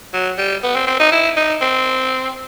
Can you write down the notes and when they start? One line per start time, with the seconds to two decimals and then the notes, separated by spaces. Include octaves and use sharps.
0.13 F#3
0.38 G3
0.63 B3
0.75 C4
0.87 C4
1.00 D#4
1.12 E4
1.37 D#4
1.61 C4